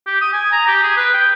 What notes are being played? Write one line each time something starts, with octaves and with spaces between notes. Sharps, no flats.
G4
D#6
G#5
A#5
G4
G#4
B4
G5